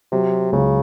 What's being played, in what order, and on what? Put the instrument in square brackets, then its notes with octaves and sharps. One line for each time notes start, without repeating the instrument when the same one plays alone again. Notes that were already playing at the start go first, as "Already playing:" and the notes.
[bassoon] C3 [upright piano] F#3
[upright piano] C#2 [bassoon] C#3